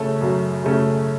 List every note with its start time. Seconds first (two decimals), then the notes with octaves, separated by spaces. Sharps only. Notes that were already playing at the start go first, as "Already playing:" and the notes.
Already playing: F#2 C#3 A3 C#4
0.21 F#2
0.64 C#3 A3 C#4